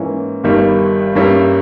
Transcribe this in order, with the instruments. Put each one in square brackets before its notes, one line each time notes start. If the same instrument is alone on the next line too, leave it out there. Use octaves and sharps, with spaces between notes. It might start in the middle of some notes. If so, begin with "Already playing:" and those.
Already playing: [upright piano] G#2 E3 A#3 C#4
G1 G2 D#3 G3
G2 G3 A#3 C#4 E4